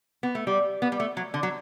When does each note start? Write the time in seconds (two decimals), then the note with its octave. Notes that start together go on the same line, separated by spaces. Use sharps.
0.23 B3
0.35 A3
0.47 G3
0.82 B3
0.92 G3
1.00 A3
1.17 F#3
1.34 D3
1.43 F#3